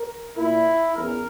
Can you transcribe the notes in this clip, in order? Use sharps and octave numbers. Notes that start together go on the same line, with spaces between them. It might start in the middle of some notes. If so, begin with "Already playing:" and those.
Already playing: A#4
A#2 E4
E2 C#3 E3 A#4